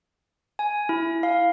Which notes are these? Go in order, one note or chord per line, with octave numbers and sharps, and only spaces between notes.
G#5
E4
F5